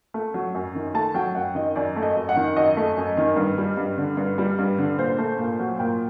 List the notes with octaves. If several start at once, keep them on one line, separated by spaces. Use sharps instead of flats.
A3
F#3
F#2
D#3
A3 A5
F#3 G5
F#2 F#5
D#3 D#5
F#2 D5
A3
D#5
F#2
F#5
D#3
F#2 D#5
A3
F#2
D#3
G2
G3
G2
D3
G2
G3
G2
D3
A#2 C5
A3
A#2
F#3
A#2 G5